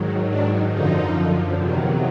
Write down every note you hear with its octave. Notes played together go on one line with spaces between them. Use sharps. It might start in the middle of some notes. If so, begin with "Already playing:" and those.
Already playing: G#2 D#3 F#3
D4
F#2 D3 F3 D#4
E2 C3 D#3 F#3